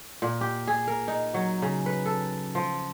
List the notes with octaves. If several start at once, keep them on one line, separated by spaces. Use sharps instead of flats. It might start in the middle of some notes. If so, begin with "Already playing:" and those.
A#2
G4
G#4
A#4
D#4
F#3
C#3
B4
A4
F3